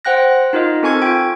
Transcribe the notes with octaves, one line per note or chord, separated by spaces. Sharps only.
C5 F#5 G5 F#6 A#6
D#4 F4 A#4 D#5
C4 A4 G#5 C#6 G#6
F4 G5 G#6 D7